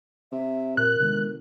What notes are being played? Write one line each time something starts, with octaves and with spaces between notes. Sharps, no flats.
C3 E5
A#2 A#4 F#6
G1 C3 D#3 G#3